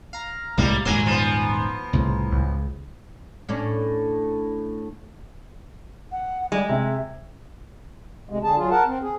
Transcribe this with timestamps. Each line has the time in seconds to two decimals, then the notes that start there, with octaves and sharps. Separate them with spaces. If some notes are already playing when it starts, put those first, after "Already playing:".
0.13 F5 A#5
0.58 C2 A2 G3 G#3 A#3
0.85 D#1 G#2 F#3 A#3 G#5 A#5 C6
1.06 F3 B3
1.93 C2 A2 C#3
2.32 C#2
3.49 A2 C#4 D4
6.12 F#5
6.52 G3 G#3
6.69 C3 E5
8.30 D2 C3 G#3
8.44 D3 G#4 A5
8.57 F#3 F4 G#4
8.70 A#4 F#5 A5
8.86 C4
9.02 G#4